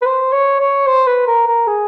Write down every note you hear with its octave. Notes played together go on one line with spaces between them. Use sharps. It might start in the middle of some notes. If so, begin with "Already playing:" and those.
B4
C5
C#5
C#5
C5
B4
A#4
A#4
G#4